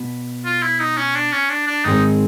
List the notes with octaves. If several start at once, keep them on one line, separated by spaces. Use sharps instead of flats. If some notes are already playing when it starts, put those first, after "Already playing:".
Already playing: B2 B3
F4
E4
D#4
C#4
D4
C#4
D4
D4
G#2 D#3 G#3 C4 D#4